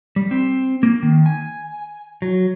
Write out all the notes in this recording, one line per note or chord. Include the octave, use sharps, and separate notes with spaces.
G3
C4
A#3
D#3
G#5
F#3